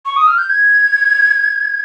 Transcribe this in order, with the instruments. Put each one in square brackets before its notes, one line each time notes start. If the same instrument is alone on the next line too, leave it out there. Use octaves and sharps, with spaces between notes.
[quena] C#6
D#6
F6
G6
G#6